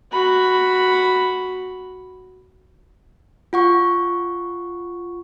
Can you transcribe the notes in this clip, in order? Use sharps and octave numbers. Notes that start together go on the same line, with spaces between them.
F#4 B5
F4 F#5 C#6